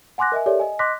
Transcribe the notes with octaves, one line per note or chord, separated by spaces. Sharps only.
F#5 G#5 C6 D6 F#6 A#6
A#4 D#5 E5 G#5
G4 A4 A#4 C#5 D5 E5
D#5 G#5
D#5 C6 D6 F#6 A#6 B6